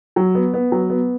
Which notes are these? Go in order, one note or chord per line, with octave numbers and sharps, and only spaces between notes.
F#3
B3
B3
F#3
B3